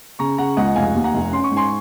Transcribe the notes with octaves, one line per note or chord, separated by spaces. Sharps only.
C#3 A#5 C#6
C#3 F#5 A#5
C#2 D#5 F#5
F#5
F1 F5 G#5
D#2
F#5 A#5
F1
C#4 C6
C#6
G#2
G#5 C6